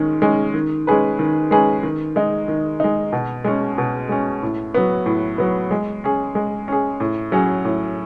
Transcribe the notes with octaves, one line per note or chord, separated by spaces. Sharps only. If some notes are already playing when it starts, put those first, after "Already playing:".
Already playing: D#3 G#3 C#4
G#3 C#4
D#3
G#3 C#4 G#4 B4
D#3
G#3 C#4 G#4 B4
D#3
G#3 D#4
D#3
G#3 D#4
B2
G#3 C#4
B2
G#3 C#4
A2
F#3 B3
A2
F#3 B3
G#3
C#4 G#4
G#3
C#4 G#4
A2
F#3 C#4 G#4
A2